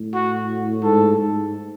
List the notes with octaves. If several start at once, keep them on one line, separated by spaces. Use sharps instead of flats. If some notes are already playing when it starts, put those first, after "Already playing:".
Already playing: A2
F#4
G#2 A4
G#2